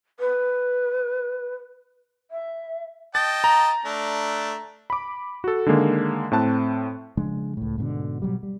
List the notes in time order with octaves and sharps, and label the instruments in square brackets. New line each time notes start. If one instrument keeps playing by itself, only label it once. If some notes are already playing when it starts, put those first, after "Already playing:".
[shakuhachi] B4
E5
[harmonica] D#5 G5 A5 [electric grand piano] A6
[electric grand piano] A#5
[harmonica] A3 D4
[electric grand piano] B5 D6
F#4 A4
D3 D#3 G#3 A#3
A2 C4 A5 F#6
[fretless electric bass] C#3 F3 G#3 D4
C#2 A2
G#2 B2 D3
B2 F#3 G3
G3